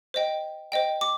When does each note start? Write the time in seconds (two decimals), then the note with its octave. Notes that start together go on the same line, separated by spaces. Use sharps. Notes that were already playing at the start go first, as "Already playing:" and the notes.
0.14 C5 D#5 G5
0.72 C5 D#5 G5
1.01 D6